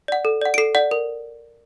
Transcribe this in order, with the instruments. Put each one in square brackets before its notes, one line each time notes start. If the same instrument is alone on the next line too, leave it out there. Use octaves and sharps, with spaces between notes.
[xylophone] D5 F#5
A4
D5 F#5
D7
A4 C7
D5 F#5
A#4